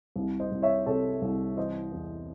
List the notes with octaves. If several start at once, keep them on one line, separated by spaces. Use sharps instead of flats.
C2
C5 D#5
C2
C#5 E5
C3 A4 C#5
C2
E3 C5 D#5
E2